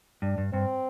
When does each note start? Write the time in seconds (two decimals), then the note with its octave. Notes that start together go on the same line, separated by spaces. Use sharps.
0.22 G2 D4
0.38 G2
0.53 G2 C4